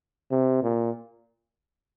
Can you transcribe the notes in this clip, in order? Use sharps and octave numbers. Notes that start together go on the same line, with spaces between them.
C3
A#2